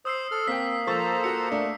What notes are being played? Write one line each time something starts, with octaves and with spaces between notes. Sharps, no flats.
C5 D#6 E6 C7
A4 F6
A#3 C4 G5 B6
F3 A4 C5 A#5 C#6 A6
F4 F#4 C#7
A3 D4